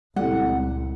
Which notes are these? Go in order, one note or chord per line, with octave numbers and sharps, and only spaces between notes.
C#2 A#2 G3 C4 E4 A4 F#5